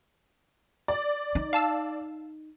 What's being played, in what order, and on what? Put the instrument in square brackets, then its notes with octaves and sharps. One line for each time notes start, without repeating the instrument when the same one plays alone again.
[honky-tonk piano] D5
[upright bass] D#4
[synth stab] F5 A5 E6